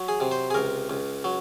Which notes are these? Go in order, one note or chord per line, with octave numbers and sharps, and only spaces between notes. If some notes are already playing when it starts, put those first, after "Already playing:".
Already playing: F#3
G#4
C3
C5
G#4
C#2 A#4
C#2
F#3